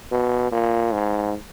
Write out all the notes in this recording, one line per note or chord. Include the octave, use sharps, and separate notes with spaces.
B2
A#2
G#2